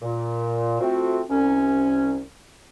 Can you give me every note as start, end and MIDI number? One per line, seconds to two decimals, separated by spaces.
0.02 0.79 46
0.81 1.21 57
0.81 1.21 60
0.81 1.21 65
0.81 1.21 66
1.30 2.21 36
1.30 2.21 61